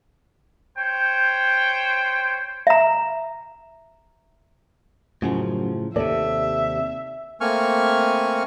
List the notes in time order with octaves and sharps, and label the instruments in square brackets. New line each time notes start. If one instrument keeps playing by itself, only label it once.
[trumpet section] C5 C#5 G5
[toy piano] E5 A#5
[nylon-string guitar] F#2 [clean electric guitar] A2 C#3 F3
[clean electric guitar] D#2 C3 [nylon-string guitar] A4 D5 [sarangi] E5
[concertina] A3 A#3 C4 G#5 C#6 F6